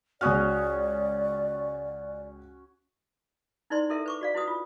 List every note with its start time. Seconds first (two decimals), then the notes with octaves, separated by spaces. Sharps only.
0.21 C#2 C#4 F#4 D5 D#6 F6
3.70 D#4 E4 B4 D5 C6
3.90 E4 A4 A#4 E5
4.06 B4 C#6 D6
4.21 F#4 D5 F5
4.35 E4 F#4 B4 D#6
4.48 F4